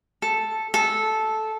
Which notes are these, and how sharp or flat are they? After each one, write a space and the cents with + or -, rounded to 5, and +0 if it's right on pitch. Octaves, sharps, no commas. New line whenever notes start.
A4 +0
A4 -10